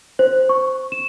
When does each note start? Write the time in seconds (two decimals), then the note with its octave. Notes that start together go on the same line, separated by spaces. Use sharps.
0.19 C5
0.49 C#6
0.92 E7